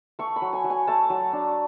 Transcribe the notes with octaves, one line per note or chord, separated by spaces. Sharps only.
A3 C#6
B5
F#3
G#5
F#3
G#5
A3 A5
F#3
D4